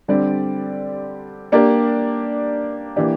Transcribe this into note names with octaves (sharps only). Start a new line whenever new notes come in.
D3 G3 C4 G4 D5
A#3 D4 G4 A#4 D5
E3 A#3 D4 G4